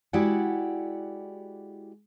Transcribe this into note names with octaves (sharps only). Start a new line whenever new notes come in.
G#3 E4 F#4 G4 D5 F#5